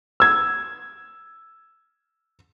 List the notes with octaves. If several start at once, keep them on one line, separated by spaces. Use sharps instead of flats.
E6 G#6